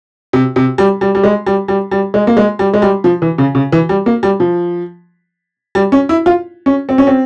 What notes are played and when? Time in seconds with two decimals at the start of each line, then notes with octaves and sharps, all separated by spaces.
0.33 C3
0.56 C3
0.78 G3
1.01 G3
1.15 G3
1.23 G#3
1.46 G3
1.68 G3
1.91 G3
2.14 G#3
2.27 A#3
2.37 G#3
2.59 G3
2.74 G#3
2.82 G3
3.04 F3
3.22 E3
3.38 C#3
3.55 C#3
3.72 E3
3.89 G3
4.06 A#3
4.23 G3
4.40 F3
5.75 G3
5.92 C#4
6.09 E4
6.26 F4
6.66 C#4
6.89 C4
6.98 C#4
7.07 C4